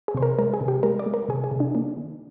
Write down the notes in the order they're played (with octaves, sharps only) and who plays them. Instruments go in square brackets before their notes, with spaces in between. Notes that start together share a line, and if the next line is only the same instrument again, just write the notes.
[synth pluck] G#4
C3 C5
A#4
G#3 A#4
G#4
C3
G4
G#3 A#4
D5
G#3
A#4
C3 G#4
G#4
C3
D4
A#3 D4
D#3